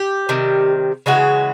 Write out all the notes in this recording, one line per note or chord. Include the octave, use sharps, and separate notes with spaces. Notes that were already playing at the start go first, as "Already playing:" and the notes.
Already playing: G4
C3 D#3 G3
C#3 E3 G#3 F#4